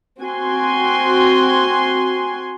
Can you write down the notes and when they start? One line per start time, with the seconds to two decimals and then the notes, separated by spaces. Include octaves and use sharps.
0.21 C4 F#4 G#5 C6